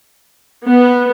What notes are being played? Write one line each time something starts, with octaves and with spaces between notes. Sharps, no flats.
B3